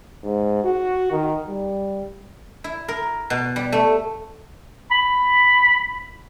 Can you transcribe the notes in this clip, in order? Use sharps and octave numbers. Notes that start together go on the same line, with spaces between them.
G#2
F#4
D#3
G3
E4
A#4
B2
G3
A3
B5